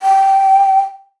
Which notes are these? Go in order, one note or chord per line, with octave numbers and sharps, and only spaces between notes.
G5